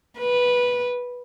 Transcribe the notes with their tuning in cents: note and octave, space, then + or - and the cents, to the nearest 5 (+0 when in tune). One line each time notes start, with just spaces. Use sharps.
B4 -10